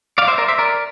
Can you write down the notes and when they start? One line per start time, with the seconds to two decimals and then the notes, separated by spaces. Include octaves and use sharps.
0.18 D5 F5
0.28 C5 E5
0.38 A#4 D5
0.48 C5 E5
0.58 A#4 D5